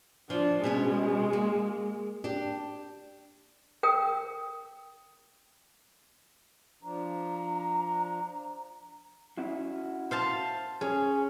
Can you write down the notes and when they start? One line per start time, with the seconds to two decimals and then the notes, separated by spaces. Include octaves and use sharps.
0.30 F3 D4
0.64 B2 G#3 C#4 C#5
1.33 A#3
2.24 D4 G4
3.83 A#4 G5 D#6
6.83 F3 D4 A#5
9.37 C#4 E4 F#4
10.11 C5 F5 A5
10.81 C#4 G#4